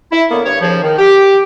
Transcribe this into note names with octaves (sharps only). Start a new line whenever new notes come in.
E4
D3 A#3 B3 E4 C#5
G2 C#5
D#2 C#3 F3
D#3
G4